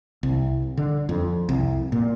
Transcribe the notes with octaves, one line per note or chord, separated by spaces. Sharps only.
C2
D3
F2
C2
A#2